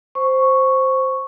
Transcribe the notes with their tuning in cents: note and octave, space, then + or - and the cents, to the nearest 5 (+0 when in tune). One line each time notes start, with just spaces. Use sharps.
C5 +0 C#6 +0